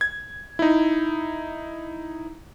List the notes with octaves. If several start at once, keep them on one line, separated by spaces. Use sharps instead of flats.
G#6
D#4 E4